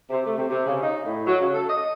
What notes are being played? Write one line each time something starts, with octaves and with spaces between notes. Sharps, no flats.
C3
A3
C3
C3
C#3
D#4
A2
F#3
C#3
A4
D#5